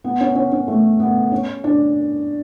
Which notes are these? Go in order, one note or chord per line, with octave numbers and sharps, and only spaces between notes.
B3
C#4
C#4
C#4
A3
B3
C#4
D4